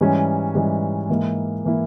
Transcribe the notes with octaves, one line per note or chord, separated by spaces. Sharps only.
G#2 E3 G3 C#4
G#2 E3 G3 C#4
G#2 E3 A#3 E4
E3 A#3 E4